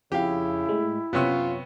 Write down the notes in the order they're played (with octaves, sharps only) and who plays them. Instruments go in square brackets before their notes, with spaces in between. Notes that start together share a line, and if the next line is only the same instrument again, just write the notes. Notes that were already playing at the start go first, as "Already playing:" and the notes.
[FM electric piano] F2 [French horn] C#3 [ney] E4 [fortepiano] G4 F5
[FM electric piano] A2 G#3
[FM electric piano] F#2 C#4 C#5 [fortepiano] C3 B3 [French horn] F4